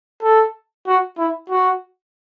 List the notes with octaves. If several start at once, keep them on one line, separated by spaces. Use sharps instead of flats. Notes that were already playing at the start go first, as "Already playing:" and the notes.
A4
F#4
E4
F#4